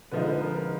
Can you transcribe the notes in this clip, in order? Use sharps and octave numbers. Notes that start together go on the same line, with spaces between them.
D3 F3 G#3 D#4 B4
B4
A#4
A#4